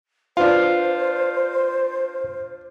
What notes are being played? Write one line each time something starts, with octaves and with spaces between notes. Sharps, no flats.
D4 F4 B4 C5 F5